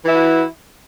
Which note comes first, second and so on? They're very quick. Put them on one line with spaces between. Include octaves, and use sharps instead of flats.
E3 E4 F#4